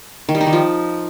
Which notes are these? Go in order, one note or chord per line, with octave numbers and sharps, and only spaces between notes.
D#3
G3
D#4
D#3
F3